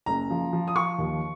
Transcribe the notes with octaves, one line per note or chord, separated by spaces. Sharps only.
F#1 A#5
F3
F3
D#6
F3 C#6
D#2